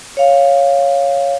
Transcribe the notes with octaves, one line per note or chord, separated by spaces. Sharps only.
C#5 F5